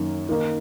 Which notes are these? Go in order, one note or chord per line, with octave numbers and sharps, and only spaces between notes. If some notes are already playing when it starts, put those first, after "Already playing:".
Already playing: F#2 D#3 A#3
D#3 A#3 D#4